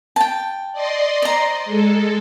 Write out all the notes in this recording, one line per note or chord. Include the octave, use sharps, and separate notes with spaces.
G5 A5
D5 D#5 C6
C5 A#5
G#3 A4